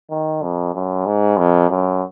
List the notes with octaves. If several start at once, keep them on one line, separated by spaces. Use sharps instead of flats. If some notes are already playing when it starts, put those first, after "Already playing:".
D#3
F2
F#2
G#2
F2
F#2